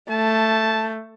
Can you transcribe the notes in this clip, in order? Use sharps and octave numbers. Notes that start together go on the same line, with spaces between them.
A3 A5